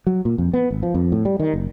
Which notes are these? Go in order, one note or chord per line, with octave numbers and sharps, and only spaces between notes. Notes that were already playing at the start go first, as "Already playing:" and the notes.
F#3
A#2
F2
B3
G#1
F3
F2
A2
G3
D#3
F#1